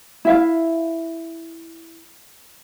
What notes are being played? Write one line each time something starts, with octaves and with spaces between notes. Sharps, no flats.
E4 E5 F5